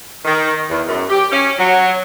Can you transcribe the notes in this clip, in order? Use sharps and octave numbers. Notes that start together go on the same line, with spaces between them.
D#3
E2
F#2
G4
C#4
F#3